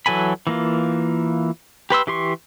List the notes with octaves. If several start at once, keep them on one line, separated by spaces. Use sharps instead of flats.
E3 F#3 A4 G#5 B5
E3 A#3 F4
G4 B4 C6 E6
E3 G4 C6 C#6